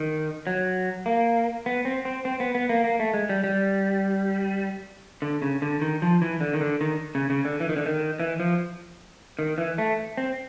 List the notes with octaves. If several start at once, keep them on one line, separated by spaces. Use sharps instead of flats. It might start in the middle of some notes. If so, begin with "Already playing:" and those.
Already playing: D#3
F#3
A#3
B3
C4
C4
C4
B3
B3
A#3
A#3
A3
G#3
G3
G3
D3
C#3
D3
D#3
F3
E3
D3
D#3
D3
D#3
C#3
C#3
D3
E3
D#3
D3
D#3
E3
F3
D#3
E3
A3
C4